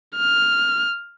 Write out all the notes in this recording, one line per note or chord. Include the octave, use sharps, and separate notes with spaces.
F6